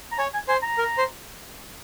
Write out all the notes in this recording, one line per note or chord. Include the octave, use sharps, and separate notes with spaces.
A#5
C#5 G#5
G#5
C5 G#5
A#5
A#4
C5